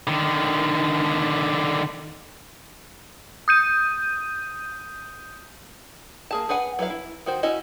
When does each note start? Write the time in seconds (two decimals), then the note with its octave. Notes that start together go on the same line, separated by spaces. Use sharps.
0.07 D3 D#3
3.48 D#6 G6 D#7
6.31 A#3 G#4 A5
6.49 G#4 B4 F#5 G#5
6.79 F#3 E4 B4 F5
6.90 E4
7.26 D#3 F#4 C5
7.43 C#4 E4 F#4 D#5